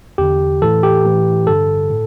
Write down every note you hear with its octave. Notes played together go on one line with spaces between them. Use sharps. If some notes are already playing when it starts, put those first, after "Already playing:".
E2 D3 G4
A2 E3 A4
G4
A2 E3
G2 D3 A4
A2